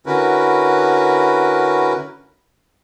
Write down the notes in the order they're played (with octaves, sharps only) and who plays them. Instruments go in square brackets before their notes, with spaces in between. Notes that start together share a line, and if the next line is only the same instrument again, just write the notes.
[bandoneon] D3 C#4 E4 F#4 A#4 B4